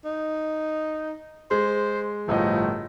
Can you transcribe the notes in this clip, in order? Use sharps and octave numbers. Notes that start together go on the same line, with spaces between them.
D#4
G#3 C5
G1 A2 F3 D#5